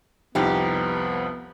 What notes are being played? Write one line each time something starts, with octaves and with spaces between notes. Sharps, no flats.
C2 F2 F3 B3 D#4 G4